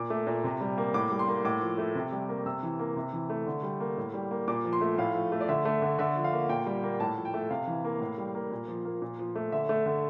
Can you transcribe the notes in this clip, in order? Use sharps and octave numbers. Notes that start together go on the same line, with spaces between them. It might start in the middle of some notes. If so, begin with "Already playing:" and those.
Already playing: A#2 D6
A3
A#2
C3
G3
A#3
A2 D6
G3
C6
A#3
A2 D6
F3
A3
C3
G3
A#3
C3 E6
E3
A#3
C3
E3
A3
D3
G3
A#3
A2
G3
A#3
A#2 D6
F3
C6
A3
A2 F5
F3
A3
D5
D3 E5
A3
D3
D3 E5
F3
F5
A#3
A#2 G5
G3
A#3
A2 A5
F3
G5
A3
C3 F5
E3
A#3
A2
G3
A#3
A#2
F3
A#3
A#2
F3
A3
D3 E5
A3
D3